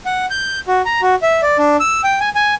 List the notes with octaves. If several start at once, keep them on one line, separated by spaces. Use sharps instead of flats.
F#5
G6
F#4
A#5
F#4
E5
D5
D4
E6
G5
G#5
G#5